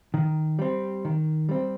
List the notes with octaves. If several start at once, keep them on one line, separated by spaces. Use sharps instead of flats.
D#3
G3 C4
D#3
G3 C4